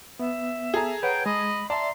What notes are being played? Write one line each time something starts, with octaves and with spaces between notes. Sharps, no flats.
B3 E5
G#4 A4 A#5
B4 C#5 F#5 G5
G#3 D#5 B5
D5 E5 A5 A#5 C6